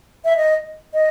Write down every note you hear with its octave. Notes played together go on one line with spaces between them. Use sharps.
E5
D#5
D#5